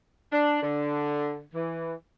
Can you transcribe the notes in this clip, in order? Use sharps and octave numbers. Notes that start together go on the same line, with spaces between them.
D4
D3
E3